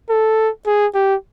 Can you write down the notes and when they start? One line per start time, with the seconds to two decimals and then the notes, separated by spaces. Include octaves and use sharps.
0.10 A4
0.67 G#4
0.95 G4